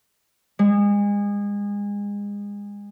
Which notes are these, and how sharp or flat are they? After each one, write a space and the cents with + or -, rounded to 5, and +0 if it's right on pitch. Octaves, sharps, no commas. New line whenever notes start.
G#3 -30